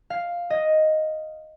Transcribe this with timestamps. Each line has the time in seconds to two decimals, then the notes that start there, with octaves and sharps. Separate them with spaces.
0.10 F5
0.50 D#5